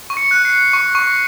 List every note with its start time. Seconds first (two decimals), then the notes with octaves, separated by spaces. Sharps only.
0.10 C#6
0.17 C#7
0.31 F#6
0.45 C7
0.52 F#6
0.73 C#6
0.95 C#6